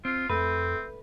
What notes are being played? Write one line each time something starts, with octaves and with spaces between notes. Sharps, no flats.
C4 F4
F2 A3 C4 B4